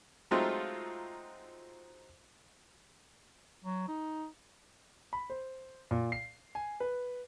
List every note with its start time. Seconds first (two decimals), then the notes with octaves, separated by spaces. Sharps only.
0.31 F#3 G#3 A3 C4 D#4 F4
3.64 F#3
3.88 D#4
5.13 B5
5.30 C5
5.91 A#2
6.12 C7
6.55 G#5
6.80 B4